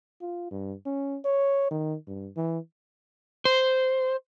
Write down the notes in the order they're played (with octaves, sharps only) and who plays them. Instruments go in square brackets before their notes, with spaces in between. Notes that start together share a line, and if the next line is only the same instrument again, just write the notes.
[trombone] F4
G2
C#4
C#5
D#3
G2
E3
[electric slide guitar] C5